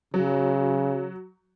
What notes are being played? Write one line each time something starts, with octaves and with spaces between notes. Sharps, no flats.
C#3 F#3